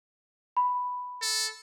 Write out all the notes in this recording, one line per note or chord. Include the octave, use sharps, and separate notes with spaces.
B5
A4